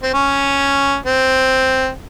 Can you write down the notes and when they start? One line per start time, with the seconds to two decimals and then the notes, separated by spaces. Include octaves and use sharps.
0.02 C4
0.14 C#4
1.06 C4